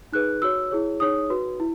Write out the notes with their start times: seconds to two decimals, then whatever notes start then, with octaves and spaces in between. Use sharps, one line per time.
0.13 D#4 G#4 B4 F#6
0.42 F#4 C#5 E6
0.71 E4 G#4 C#5
1.00 D#4 G#4 C#5 D#6
1.30 F#4 B4
1.60 E4